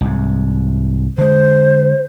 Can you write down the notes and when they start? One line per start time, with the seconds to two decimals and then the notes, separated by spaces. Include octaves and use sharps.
0.01 C2 G#2
1.18 D3 G#3 C5